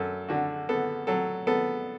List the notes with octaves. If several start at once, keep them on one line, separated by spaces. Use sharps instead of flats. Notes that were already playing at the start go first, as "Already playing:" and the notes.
Already playing: F#2 A4
D3 F#4
B3 A4
F#3 A4
B3 A4